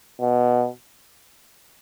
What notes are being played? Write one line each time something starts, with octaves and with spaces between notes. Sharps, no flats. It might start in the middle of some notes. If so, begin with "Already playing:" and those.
B2